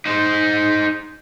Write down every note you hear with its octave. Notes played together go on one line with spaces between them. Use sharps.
D#4 C5